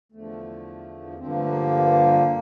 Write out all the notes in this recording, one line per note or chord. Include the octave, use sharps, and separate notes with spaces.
E2 D3 F3 A3
G2 D3 F3 C4
A#3
A3
A#3